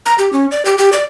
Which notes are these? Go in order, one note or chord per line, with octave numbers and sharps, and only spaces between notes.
A#5
G4
C#4
D5
G4
G4
D5